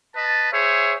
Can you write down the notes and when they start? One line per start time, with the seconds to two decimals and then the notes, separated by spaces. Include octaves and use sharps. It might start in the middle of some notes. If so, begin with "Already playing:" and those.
0.16 B4 D#5 A5
0.52 G#4 C5 C#5 E5